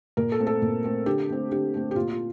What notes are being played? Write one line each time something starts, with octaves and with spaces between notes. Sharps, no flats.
A#2 A#4
A4
A3 C4
A4
A#2
A3 C4
D3 G4
A3 C4
D3 G4
A3 C4
G4
A#2 F4
F4